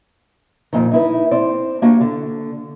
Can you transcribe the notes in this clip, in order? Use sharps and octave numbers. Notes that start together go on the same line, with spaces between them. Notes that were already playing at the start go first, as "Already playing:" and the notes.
F2 A#2 D#3
D#4 E4 B4
C4 D5
A#3 D4 F#4 G4 F#5
D3